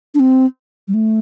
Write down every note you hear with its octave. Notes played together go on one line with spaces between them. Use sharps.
D4
C4
G3
A3